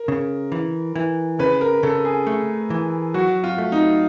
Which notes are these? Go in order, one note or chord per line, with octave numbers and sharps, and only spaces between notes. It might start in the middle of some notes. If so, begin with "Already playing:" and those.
Already playing: A#4
C#3
E3
E3
C#3 B4
A#4
C#3 A4
G#4
A3
E3
F#3 F#4
F4
A3
D#4